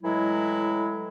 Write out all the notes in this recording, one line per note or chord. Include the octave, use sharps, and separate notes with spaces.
A2 E3 F#3 G#3 E4